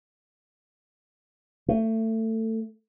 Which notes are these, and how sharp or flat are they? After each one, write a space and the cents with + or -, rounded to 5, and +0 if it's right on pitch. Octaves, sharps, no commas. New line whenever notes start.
A3 +20